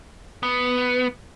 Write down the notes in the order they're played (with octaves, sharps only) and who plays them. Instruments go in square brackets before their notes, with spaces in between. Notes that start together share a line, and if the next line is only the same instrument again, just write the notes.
[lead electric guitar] B3